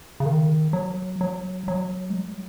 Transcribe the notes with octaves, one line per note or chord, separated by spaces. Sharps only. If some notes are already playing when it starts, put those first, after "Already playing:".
C#3
D#3
F#3
F#3
F#3
G#3
F#3